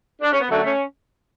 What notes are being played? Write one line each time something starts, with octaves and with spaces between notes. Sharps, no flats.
D4
C#4
B3
F#2 D3 F#3 A3
A3 C#4